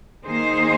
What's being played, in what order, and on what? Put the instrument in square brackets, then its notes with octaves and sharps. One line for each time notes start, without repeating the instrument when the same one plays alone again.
[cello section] D#3 A#3 D#4 G#4 C5